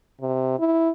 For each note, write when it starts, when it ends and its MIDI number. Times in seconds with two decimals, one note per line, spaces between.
0.21 0.56 48
0.59 0.90 64